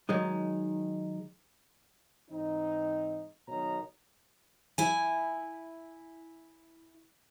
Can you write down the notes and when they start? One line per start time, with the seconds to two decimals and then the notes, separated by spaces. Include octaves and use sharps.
0.09 D#3 F#3 G#3 D#4
2.30 G#2 E3 C4 D#4
3.48 B1 B2 D#3 D#4 C#5 A#5
4.78 E4 G#5